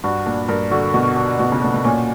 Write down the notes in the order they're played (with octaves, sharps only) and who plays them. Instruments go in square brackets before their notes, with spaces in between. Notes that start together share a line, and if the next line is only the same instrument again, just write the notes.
[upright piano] G2 [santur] F#4
[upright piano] A#2 [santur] D4
[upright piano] G2 [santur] A#4
[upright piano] D3 [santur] F#4
[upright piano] B2 [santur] F#4
[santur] D4
[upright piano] B2 [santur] F#4
[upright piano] C#3
[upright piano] B2 [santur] D4
[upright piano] B2
[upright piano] A#2 [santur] C#4